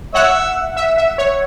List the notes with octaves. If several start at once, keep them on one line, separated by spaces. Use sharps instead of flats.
C#5 E5 F#5
E5
E5
C#5